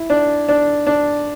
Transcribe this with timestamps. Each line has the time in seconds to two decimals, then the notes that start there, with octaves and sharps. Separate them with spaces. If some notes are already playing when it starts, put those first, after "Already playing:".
Already playing: E4
0.10 D4
0.49 D4
0.87 D4